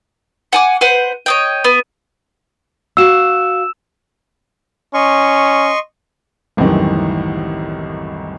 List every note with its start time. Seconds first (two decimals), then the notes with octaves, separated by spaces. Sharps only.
0.53 F#5 G#5 D6
0.81 B4 C5 F#5
1.26 C#5 D#5 G5
1.64 B3
2.97 F#4 F5 E6 E7
4.94 C#4 D#5 C6 C#6
6.57 F#1 C2 F#2 A2 D#3 E3